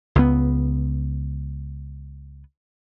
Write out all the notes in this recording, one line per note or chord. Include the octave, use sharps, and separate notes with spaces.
C#2 B3